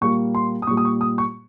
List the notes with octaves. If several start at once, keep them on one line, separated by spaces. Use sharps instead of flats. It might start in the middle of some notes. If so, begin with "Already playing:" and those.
A#2 G3 A#3 C#6
C6
D#6
A#2 G3 A#3 C#6
D#6
C#6
D#6
C#6